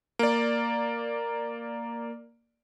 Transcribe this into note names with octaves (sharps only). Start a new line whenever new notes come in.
A#3 D5